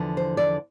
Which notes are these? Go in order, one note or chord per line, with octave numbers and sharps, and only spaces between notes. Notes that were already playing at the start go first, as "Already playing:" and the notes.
Already playing: E2 D3 F3
C5
D5